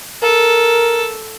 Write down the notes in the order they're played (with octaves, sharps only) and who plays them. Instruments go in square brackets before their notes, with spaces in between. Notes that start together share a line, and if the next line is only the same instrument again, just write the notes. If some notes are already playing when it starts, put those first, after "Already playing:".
[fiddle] A4 [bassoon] A#4